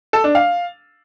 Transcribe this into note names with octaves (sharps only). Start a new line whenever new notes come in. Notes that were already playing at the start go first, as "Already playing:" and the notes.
A4
D4
F5